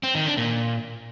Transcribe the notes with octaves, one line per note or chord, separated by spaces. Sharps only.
C4
D#3
D4
A#2